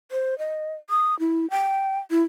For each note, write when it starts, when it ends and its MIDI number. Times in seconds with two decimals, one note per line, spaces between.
0.11 0.38 72
0.39 0.74 75
0.90 1.18 87
1.20 1.49 64
1.50 1.99 79
2.11 2.22 64